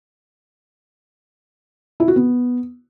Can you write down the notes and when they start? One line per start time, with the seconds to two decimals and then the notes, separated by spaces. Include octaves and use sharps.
2.00 E4
2.08 F#4
2.16 B3